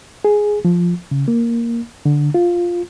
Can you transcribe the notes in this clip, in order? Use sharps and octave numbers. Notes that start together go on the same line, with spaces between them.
G#4
F3
C#3
A#3
D3
F4